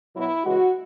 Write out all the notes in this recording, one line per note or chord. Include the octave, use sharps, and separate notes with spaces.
B2 F#3 B3 E4
C#3 E3 G#3 F#4